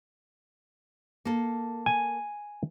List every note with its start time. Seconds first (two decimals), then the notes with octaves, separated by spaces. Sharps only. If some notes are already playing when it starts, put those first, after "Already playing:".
1.25 A#3 A4
1.86 G#5